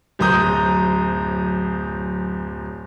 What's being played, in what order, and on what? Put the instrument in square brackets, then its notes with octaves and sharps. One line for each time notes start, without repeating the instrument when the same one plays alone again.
[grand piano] D1 F#2 C5 A#5 D#6 G6